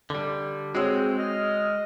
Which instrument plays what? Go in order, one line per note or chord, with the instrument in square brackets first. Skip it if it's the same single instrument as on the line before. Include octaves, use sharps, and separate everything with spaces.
[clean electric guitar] D3 G3
[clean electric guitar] G#3 [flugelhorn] C4 [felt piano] F#4 C#5 E6 [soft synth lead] G#4
[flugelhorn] D#5 [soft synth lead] F6